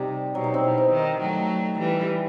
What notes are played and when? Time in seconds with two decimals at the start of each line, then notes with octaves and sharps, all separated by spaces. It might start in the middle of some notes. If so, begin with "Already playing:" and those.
Already playing: C3 G3 D#4
0.34 B2 F#3
0.44 D#4
0.54 C4
0.63 B2 E4
0.78 D#4
0.92 D#3
1.21 F#3 A3
1.79 E3 G3